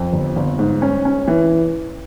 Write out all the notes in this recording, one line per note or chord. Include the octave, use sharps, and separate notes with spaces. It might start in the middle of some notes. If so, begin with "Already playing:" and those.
Already playing: F2
G1
G1
G#2
C#4
C#4
E3